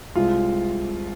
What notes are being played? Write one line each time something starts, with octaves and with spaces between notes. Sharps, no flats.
C2 C3 G#3 F4